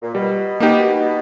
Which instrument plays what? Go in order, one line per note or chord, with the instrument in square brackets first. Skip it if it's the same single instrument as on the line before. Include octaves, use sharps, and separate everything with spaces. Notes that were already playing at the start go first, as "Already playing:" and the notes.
[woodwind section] A#2
[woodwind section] B2 [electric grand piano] G3
[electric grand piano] A#3 D#4 G4